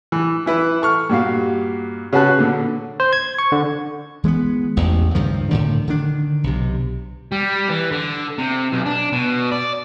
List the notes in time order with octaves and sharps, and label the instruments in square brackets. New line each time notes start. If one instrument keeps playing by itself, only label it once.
[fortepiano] E3
E3 E4 B4
A4 C#6 F6
G2 A#2 F#4 F5
C#3 C#4 F#4 B4 A5 F#6
A#2 D3
[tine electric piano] C5
G#6
C#6
D3
[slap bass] E3 G#3 A#3 B3
A1 E2
C#2 G2 D#3 F3
A2 D3 D#3
D3 D#3 D4
B1 C3
[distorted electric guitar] G3
E3
D3
C3
B1
D4
B2
D5